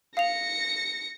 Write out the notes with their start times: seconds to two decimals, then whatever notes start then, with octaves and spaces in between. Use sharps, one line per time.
0.17 F5 A#6 C#7 F7